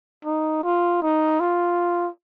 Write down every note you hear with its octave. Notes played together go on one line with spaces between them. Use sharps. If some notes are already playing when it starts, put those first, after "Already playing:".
D#4
F4
D#4
F4